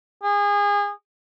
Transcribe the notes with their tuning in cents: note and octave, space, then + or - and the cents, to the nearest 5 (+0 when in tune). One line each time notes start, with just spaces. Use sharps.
G#4 -30